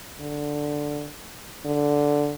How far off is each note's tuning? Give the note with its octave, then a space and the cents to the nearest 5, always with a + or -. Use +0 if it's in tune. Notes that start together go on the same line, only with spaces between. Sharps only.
D3 +0
D3 -5